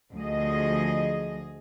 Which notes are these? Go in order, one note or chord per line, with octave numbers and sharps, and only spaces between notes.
D2 F3 G#4 D#5